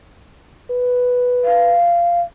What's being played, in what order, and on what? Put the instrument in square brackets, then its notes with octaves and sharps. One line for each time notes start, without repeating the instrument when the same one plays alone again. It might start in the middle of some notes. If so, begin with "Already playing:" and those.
[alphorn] B4
[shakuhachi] F5